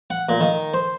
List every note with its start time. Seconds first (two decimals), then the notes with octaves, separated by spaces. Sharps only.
0.10 F#5
0.29 A#2
0.40 D#3
0.74 C5